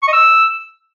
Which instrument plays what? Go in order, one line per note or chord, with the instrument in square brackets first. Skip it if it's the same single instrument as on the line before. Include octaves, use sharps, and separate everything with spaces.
[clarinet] C#6
D#5
E6